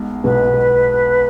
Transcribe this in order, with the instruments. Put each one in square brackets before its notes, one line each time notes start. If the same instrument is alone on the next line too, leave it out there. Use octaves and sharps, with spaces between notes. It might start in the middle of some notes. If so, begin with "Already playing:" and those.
Already playing: [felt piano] B1 B2 G#3
[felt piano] B1 B2 G#3 [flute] B4